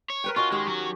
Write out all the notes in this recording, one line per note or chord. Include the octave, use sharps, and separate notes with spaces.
C#5
A#4 B4 G5
C#4 F4 F#4 D#5
D#3 G#3 G4
F#3 F#4